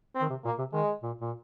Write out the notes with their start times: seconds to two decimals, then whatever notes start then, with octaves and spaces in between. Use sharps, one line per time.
0.15 C4
0.21 D#3
0.30 C3
0.45 A#2 A#3
0.58 C3
0.73 D#3 G#3
1.02 A#2
1.21 A#2